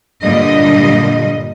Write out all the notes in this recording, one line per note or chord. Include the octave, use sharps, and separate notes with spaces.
G2 A#2 D3 G3 D#5